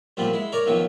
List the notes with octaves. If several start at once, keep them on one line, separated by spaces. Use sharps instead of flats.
F#2 A#2 F3 G3 B3 C4
G#3 E4
A#4 C#5 D5 G#5 A#5
B1 B2 D#3 F3 F#3